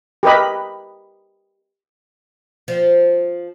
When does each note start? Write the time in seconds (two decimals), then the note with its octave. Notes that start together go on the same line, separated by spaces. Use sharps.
0.23 G4 A#4 B4 D#5 B5
2.68 F3